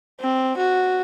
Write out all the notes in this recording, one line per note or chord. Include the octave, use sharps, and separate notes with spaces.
C4
F#4